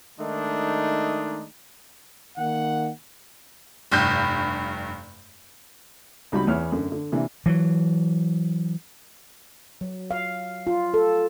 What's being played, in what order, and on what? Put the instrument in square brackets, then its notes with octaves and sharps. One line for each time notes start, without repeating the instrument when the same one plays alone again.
[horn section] D#3 G#3 A3 D4 D#4
[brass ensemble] D#3 A#3 F#5
[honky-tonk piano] F1 G2 G6
[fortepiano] C#2 G3 D#4 F#4 B5
E2 E3 B3 C#5 F6
F#2 D3
D3
C3 E3 A#3 D4
[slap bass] E3 F#3
[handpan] F#3
F5
F4
A4